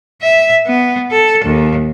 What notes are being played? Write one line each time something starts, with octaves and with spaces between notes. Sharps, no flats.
E5
B3
A4
D#2